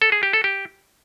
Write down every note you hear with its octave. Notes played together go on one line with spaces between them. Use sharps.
A4
G#4
G4
A4
G4